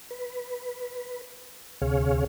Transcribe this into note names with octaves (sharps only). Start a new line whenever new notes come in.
B4
D2 C3 G#4 C#5 F5